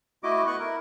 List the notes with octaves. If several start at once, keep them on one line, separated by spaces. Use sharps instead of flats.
A3 E4 F#4 D#5 D6
B3 D#5 F#5 C#6 F#6
E4 A#4